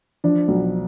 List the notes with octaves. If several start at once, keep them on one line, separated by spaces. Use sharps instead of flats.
F3 D4
B1